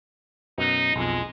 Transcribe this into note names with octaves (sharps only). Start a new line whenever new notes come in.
F#2 B2 D#4
B1 F2 G#3